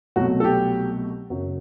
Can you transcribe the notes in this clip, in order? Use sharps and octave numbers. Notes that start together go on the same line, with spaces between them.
C2 B2 F#3 A3 F#4
A4
G4
F#1 F#2 F#3